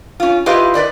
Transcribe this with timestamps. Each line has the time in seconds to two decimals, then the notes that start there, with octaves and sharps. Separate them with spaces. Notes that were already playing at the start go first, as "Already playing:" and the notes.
0.20 C#4 F4
0.46 E4 F4 G4 B4 D#5 F5
0.74 B4 C5 D5 D#5